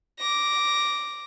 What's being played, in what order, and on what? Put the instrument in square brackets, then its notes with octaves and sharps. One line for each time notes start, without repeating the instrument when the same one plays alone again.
[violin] D6 A#6